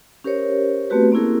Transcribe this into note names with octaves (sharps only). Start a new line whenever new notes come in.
C#4 G4 A#4 C5 C#5
A3 B3 C4 F#4 G4 B4
A#3 C4 C#4 E4 G#4 A#4